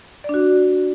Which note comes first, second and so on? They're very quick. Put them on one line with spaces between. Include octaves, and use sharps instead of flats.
D5 D4 F#4